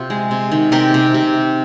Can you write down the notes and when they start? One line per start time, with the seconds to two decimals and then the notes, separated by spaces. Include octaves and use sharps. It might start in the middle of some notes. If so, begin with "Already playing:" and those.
Already playing: C3 F4
0.10 G#3
0.31 C3
0.51 D#3
0.72 C3 G4 A#4
0.94 C3
1.14 C3